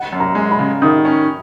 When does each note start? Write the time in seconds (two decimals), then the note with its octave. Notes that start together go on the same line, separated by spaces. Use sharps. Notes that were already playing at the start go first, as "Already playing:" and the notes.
Already playing: F#5
0.13 F#2
0.20 A#5
0.35 G#3
0.51 B5
0.59 C#3
0.82 D#3 D#6
1.05 C#4